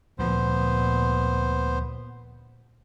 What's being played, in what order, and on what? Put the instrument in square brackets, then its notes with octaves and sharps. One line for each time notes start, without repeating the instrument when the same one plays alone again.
[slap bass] D2 F3 [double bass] A#2 [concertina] B3 C5